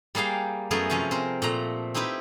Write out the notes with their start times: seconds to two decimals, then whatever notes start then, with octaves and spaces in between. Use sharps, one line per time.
0.15 G3 A#3 G#4 F5 G5
0.71 F#2 A3 B3 G#4 A#4
0.90 C3 F3 C#4
1.11 C4 A#4
1.42 A#2 A3 A#5
1.94 C4 D#4 E4 G4 B4